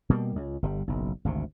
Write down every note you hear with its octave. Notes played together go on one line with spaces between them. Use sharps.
B2 G3 A#3
C#2
G1 C#3 G3
F#1 B1
G#1 D2 C3